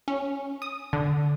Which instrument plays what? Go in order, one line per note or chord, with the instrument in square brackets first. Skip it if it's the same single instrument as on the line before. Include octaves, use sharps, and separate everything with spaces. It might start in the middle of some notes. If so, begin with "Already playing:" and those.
[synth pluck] C#4
D#6
D3